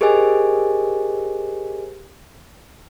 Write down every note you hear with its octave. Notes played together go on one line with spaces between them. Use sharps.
G4 G#4 A#4 C5 D#5 G#5